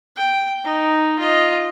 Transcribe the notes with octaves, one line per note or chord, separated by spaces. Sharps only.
G5
D#4
F4 D#5